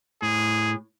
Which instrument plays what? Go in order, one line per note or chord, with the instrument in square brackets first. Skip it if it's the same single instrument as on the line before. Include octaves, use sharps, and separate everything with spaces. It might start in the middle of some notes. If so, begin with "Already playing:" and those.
[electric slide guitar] A2 [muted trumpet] G#4